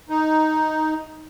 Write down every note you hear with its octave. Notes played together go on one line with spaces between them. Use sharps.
D#4